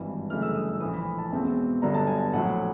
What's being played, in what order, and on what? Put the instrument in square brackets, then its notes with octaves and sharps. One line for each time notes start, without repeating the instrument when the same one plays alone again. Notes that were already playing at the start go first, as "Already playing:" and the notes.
Already playing: [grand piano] G#1 G2 E3
G1 F#2 C#3 E3 A3 F6
E6
D#6
E6
A#1 A2 E3 D#6
B5
A5
E1 E2 B2 G#3 C4
G1 G2 D3 F#3 B3 A#5
A5
G#5
A5
A#1 A2 F#3 F#5